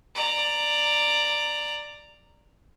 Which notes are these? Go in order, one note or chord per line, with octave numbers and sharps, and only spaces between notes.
D5 A#5